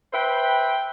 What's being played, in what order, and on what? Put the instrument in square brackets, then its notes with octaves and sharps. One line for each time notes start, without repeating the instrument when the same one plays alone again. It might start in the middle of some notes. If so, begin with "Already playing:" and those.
[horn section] B4 C5 E5 G5 B5